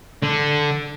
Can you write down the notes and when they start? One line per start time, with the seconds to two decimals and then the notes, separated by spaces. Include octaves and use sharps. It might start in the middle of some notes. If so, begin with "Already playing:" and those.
0.23 D3